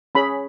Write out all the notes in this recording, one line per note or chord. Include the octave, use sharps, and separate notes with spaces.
C#4 G#4 C#5 B5